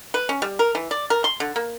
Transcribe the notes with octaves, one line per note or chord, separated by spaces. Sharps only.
B4
C#4
G3
A#4
E3
D5
A#4
C6
D3
A#3